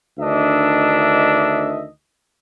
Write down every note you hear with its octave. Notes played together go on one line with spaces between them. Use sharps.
D2 D#3 D4 D#5 E5